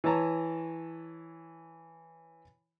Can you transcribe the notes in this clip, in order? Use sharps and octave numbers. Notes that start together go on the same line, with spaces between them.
E3 C#5 A5 A#5